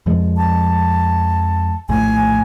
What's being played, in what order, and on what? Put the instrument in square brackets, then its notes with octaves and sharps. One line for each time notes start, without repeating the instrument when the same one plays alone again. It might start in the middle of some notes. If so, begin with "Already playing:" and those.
[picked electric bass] F2 F3 G#3
[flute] A5
[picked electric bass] A#1 D#2 A2 [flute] G#5